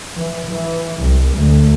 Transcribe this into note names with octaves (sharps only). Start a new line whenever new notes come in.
E3
E3
C2
D2